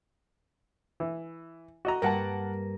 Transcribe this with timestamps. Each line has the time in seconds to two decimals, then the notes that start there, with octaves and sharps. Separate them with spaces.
1.00 E3
1.85 F#4 D#5 A#5
2.02 G2 A#3 A#4 F#5 A5 A#5